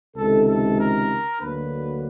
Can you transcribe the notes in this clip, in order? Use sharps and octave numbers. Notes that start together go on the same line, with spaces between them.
C#2 C3 D#3 A4
A4
A#4
D2 D3 F#3 A#3 D4 B4